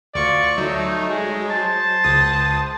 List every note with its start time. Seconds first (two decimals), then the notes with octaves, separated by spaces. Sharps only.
0.15 D2 F4 D5 C#6 C#7
0.58 F#3 A3 D#4
1.09 G#3
1.51 C5 A5
2.04 C#2 D#6 A6